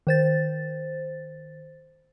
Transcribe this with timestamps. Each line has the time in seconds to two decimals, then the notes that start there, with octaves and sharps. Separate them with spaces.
0.07 D#3 C5 A6